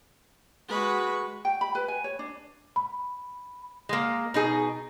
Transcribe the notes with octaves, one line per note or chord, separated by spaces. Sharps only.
G#3 F#4 B4 C#6
G5
B5
B4
G#5
C#5
D4
B5
G#3 A#3
B2 D#4 G#4